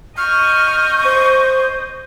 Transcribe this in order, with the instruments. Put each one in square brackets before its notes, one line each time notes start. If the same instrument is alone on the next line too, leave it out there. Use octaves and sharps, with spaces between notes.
[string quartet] D#5 G6 [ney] C#6 [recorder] F6
[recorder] C5